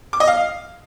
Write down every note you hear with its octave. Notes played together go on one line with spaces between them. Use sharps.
D6
D#5
F5